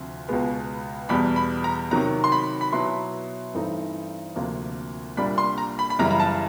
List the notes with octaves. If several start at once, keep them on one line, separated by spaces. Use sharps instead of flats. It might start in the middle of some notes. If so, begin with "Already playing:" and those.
Already playing: D2 C3 F3
C#2 B2 G#3 B3
E2 B2 G3 B5
B5
A#5
C3 D#3 F#3 A#5
C6
B5
B5
B2 F#3 B3 E4 C6
G2 E3 A3 C4 D#4
D2 C3 F3 A#3
C2 A#2 G3 A#3 D4 B5
C6
A#5
B5
B5
F#2 C#3 E3 G3 A#5
A#5
A5